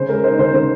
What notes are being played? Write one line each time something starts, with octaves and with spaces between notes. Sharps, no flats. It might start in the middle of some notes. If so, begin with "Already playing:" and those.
Already playing: C#3 C5
G#3 A#4
D#4 C5
C#3 C5
C#3 C5